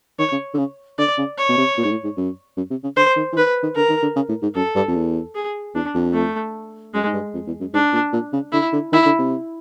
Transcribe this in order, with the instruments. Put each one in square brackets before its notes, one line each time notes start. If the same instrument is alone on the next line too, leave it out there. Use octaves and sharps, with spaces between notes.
[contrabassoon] D#3 [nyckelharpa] C#5
[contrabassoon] C#3
D3
C#3
[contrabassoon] D3 [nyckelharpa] D5
[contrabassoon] C#3
[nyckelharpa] C#5
[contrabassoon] B2
C3
A#2
G#2
A2
G#2
F#2
F#2
C3
C#3
[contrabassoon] D3 [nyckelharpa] C5
[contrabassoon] D#3
E3
[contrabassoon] D#3 [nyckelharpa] B4
[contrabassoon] D#3
[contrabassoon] D3 [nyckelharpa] A#4
[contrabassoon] D#3
D3
C#3
A2
G#2
[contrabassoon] F#2 [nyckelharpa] A4
[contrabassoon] G2
F2
E2
[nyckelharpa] G#4
[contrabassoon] E2 [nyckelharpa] D4
[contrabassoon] F2
[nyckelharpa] A3
[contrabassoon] F#2 [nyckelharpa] G#3
[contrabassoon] G#2
G2
F2
E2
F#2
[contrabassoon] G#2 [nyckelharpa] D4
[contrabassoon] A#2
A#2
C#3
[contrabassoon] D3 [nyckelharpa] E4
[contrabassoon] D3
[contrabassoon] D#3 [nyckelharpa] E4
[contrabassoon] D3
C3